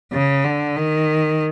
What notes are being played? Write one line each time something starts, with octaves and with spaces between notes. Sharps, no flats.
C#3
D3
D#3